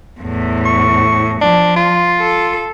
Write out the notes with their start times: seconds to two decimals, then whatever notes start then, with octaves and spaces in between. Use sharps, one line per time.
0.20 E2 A2
0.65 C#6
1.41 F3 D4
1.76 F4
2.20 A4